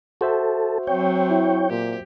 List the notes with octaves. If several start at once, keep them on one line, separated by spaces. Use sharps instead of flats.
F#4 A4 C5 E5
F#3 C4 C#5 G5
E4
A#2 G4